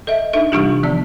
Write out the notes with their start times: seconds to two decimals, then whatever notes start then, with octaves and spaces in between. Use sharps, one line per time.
0.07 A4 D#5 E5
0.33 D4 D#4 A4 E5
0.52 C3 E3 G3 D4 F4 G4
0.83 D#3 F3 B3 D5 A5